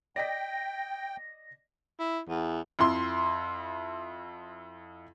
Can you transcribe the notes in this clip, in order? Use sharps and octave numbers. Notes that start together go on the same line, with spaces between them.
D5 D#5 G5 A#6 B6
E4
E2
F2 E4 C6